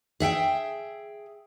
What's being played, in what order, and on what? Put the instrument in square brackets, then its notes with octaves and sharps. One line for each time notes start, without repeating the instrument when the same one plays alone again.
[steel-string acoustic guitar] G#4 E5 F#5 G5